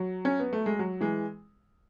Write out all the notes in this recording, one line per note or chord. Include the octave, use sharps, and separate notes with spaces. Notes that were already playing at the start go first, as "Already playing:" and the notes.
Already playing: F#3
C#4
B3
A3
G#3
F#3
E3 G#3